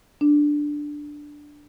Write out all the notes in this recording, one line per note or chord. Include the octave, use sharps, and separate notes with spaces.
D4